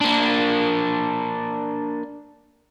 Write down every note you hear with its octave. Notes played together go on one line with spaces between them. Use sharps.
A#3 D4